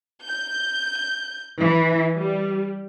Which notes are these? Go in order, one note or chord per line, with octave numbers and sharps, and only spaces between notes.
G6
E3
G3